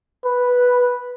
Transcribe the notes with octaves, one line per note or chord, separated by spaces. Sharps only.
B4